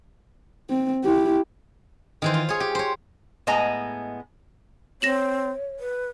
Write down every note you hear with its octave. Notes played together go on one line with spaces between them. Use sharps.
C4
E4 G4
D#3 E3 C5
F4
G#4 C#5
G4
C5 C#5
A2 G#3 B3 D#5 G#5 A#5
C4 C#5 A#6 E7 F#7
B4